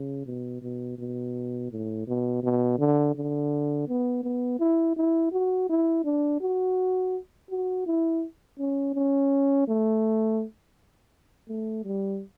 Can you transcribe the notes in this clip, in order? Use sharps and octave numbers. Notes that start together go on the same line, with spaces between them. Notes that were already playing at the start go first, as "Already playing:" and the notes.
Already playing: C#3
B2
B2
B2
A2
B2
B2
D3
D3
B3
B3
E4
E4
F#4
E4
D4
F#4
F#4
E4
C#4
C#4
A3
A3
G3